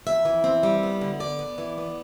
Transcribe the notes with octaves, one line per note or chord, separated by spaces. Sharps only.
F2 E5
E3
C4
G3
B3
D3
B3 D5
B3
E3
B3